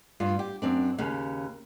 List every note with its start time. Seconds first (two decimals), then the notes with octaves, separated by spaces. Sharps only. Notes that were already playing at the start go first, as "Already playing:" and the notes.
0.20 G2 F4
0.39 G4
0.62 F#2 C4 D4
0.98 D#2 C#3